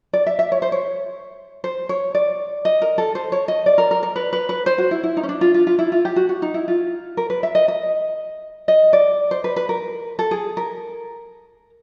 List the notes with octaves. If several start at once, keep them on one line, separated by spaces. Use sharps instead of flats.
D5
E5
E5
C#5
C5
C#5
C5
C#5
D5
D#5
A#4
A4
C5
C#5
D#5
D5
A#4
A#4
A#4
B4
B4
B4
C5
F#4
E4
E4
D#4
C#4
D4
F4
F4
F4
E4
F4
G4
F#4
F#4
D#4
E4
F4
A#4
B4
E5
D#5
D#5
D#5
D5
C5
B4
B4
A#4
A4
G#4
A#4